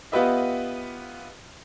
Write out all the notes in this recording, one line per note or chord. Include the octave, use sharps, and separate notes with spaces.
B3 F4 G4 B4 D#5 E5